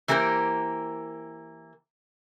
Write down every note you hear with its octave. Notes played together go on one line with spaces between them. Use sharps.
E3 A#3 G4 A#4 C5